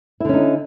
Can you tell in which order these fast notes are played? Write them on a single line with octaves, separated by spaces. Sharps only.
E4 D3 C#4 D#4